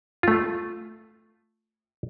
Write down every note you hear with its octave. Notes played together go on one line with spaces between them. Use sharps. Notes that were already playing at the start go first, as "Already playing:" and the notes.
A3 F4